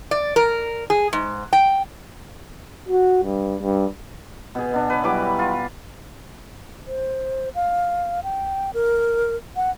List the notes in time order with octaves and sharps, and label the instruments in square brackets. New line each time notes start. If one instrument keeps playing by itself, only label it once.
[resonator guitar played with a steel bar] D5
A#4
G#4
G#2
G5
[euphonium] F#4
G2
G2
[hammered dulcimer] B2 G#4
B2 D4
B4 C#5
E3 F#3 G3 D6
F4
[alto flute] C5
F5
G5
A#4
F#5